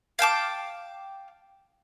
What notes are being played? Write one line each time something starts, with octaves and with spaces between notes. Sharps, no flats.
F5 G5 A5 D6